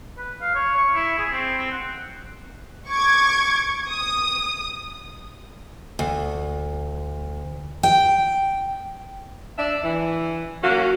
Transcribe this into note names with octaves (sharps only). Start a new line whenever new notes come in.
B4
F5
C#5
C#6
E4
G#4
C4
C4
F#5
C#6 D6 G#6
D#6
D2
G5
D4 D5 E5
E3
F#3 A#3 C#4 F#4